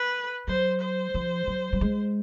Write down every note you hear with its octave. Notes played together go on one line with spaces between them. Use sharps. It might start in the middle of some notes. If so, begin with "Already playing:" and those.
Already playing: B4
F#3 C5
C5
F3
F#3
G3
G#3